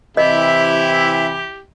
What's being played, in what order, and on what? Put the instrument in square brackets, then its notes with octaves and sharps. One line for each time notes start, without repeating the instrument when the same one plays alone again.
[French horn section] C3 E3 [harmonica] E4 G4 [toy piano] D#5 [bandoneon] E5